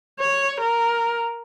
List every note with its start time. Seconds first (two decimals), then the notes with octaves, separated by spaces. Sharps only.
0.20 C#5
0.61 A#4